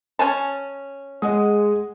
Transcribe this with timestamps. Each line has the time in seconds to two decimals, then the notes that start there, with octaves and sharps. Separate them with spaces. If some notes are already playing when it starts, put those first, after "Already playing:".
0.19 C#4 G#5 A5
1.22 G#3 D#5 F#5 D#6